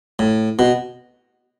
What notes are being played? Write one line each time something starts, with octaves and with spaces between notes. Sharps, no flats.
A2
B2